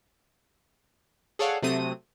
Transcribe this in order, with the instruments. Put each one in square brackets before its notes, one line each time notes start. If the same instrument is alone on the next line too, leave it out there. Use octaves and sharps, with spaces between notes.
[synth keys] G#4 A4 C#5 D5 F5 F#5
C3 F#3 A3 C4 D#6 D#7